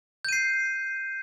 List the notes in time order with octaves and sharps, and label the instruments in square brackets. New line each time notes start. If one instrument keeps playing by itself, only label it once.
[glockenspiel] G6
D#7
C7